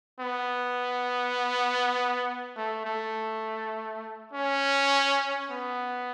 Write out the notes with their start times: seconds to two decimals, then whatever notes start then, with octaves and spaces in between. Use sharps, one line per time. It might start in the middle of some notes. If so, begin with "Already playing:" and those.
0.20 B3
2.56 A3
2.85 A3
4.33 C#4
5.51 B3